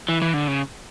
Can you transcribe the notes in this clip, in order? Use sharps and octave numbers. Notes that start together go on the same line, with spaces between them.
E3
E3
D3
C#3